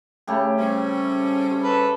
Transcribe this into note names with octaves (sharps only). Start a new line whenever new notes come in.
C#3 A3 G4
G3 C4 C#4
A4 B4